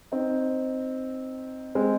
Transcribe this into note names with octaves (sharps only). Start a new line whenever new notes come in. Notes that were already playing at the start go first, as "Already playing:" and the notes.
C4 D#4
G#3 C4